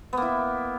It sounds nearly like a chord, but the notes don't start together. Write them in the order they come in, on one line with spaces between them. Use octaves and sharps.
B3 A#3 E4